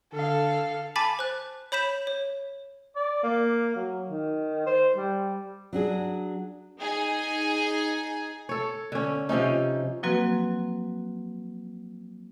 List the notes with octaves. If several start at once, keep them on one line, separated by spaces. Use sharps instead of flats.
D3 A4 F5
G#5 A5 B5 D6 A6 B6
C5 F#6
C#5 B5 G6 B6 E7
C#5
D5
A#3
F#3
D#3
C5
G3
F#3 D4 G#4
D#4 G#4 G#5
A4 C#5
D3 C#4
C3 F3 C#4 D#4
F3 F#3 A#3 C4 F#4 B4